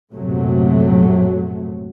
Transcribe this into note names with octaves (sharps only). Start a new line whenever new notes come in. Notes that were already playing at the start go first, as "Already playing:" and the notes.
A#1 F#2 A2 C3 F#3 A3